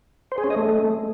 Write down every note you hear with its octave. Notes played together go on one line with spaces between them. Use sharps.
C5
G#4
C#4
D#5
A3